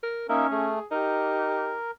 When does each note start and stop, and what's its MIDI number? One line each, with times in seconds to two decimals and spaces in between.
0.03 0.26 70
0.29 0.45 58
0.29 0.70 61
0.29 0.47 63
0.29 0.47 70
0.29 0.47 76
0.51 0.79 57
0.51 0.85 68
0.91 1.79 63
0.91 1.74 67
0.91 1.91 70